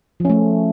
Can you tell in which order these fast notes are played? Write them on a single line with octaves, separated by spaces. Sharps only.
F3 C#4 A3